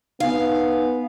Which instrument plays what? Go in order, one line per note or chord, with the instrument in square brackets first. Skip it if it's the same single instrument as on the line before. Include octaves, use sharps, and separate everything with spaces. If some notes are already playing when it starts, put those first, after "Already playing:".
[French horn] B3 [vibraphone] D#4 G#5 [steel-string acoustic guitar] F5